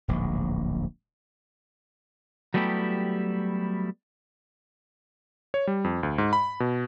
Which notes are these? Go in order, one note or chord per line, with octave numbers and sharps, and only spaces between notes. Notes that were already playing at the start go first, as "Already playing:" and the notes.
D1 A#1 G#2
F#3 G3 A3 B3 E4 G4
C#5
G3
F2
D2
G#2
B5
B2